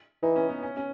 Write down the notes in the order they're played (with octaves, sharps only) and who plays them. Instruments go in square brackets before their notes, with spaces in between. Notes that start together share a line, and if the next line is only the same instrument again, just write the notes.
[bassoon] E3 [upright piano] D#4
[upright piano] C#4
B3
C#4
C#4